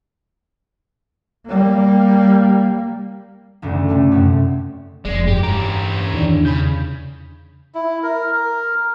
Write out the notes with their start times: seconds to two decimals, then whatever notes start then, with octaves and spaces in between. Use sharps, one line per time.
1.47 G3 A#3
3.62 F#1 D2 C#3
3.89 C3 A3 D4
4.12 F#2 C#3 C4
5.05 F1 F2 G#3 D5
5.27 G2 G4
5.43 C#4 G4 A#5
6.13 E2 D#3 E3 D4
6.45 C#3 B5 G6
7.75 E4
8.03 A#4
8.33 A#4